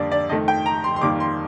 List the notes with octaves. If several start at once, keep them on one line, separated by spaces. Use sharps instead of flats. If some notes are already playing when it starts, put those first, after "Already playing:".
Already playing: F2 D3 G3 A#3 D5
D5
F2 D#3 A3 D#5
G5
A#5
C6
C6
F2 D#3 G3 A#3 D6
C6